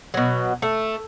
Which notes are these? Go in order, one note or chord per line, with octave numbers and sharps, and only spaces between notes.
B2 F#3
A3